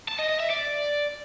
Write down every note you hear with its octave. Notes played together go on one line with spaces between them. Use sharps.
A5
D#5
D#5
E5
D5